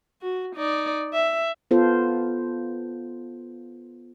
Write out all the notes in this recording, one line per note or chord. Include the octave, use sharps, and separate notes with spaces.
F#4
D#4 D5
E5
B3 F4 A4 C5